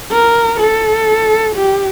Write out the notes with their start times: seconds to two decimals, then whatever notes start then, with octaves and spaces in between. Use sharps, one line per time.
0.12 A#4
0.59 A4
1.56 G4